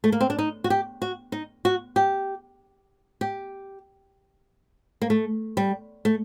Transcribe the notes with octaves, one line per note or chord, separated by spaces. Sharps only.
A3
A#3
C4
D4
D#4
F#4
G4
F#4
D#4
F#4
G4
G4
A#3
A3
G3
A3